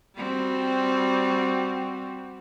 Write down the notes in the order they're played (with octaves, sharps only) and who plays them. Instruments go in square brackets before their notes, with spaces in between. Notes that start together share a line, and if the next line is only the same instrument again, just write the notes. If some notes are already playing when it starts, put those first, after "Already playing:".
[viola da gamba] G3 C4 F#4